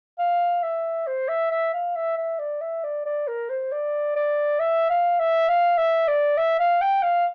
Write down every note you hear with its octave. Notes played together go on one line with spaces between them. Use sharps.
F5
E5
C5
E5
E5
F5
E5
E5
D5
E5
D5
D5
A#4
C5
D5
D5
E5
F5
E5
F5
E5
D5
E5
F5
G5
F5